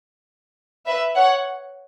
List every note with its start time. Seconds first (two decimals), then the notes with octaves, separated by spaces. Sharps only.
0.86 B4 E5
1.16 C#5 F#5